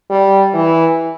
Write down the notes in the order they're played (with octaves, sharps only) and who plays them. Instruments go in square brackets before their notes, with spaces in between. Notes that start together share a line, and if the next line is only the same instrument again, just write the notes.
[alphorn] G3
E3